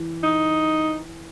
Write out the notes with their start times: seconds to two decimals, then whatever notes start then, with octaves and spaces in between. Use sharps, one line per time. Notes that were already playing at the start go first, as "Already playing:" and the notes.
Already playing: E3
0.23 D#4